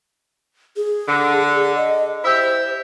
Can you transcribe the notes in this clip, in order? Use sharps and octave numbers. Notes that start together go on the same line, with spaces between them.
G#4
D3
D#5
E4 G4 C5 E5